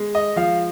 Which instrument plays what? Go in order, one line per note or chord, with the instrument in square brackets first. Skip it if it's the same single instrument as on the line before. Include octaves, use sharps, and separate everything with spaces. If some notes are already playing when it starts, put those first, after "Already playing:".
Already playing: [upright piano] G#3
D#5
F3 F5